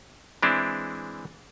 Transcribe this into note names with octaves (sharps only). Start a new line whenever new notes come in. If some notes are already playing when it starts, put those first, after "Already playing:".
E3 G#3 C4 D4 E4